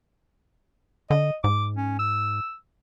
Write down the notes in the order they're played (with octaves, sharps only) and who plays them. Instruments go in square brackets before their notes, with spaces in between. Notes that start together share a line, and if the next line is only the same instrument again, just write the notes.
[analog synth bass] D3 [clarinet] D#5
[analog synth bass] G#2 [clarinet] D6
[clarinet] C#4
E6